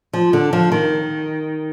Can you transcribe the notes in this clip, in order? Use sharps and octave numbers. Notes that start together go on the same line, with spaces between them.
F3
D3
F3
D#3